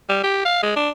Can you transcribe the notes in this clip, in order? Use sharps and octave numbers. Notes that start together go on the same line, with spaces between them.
G3
G4
F5
G#3
D4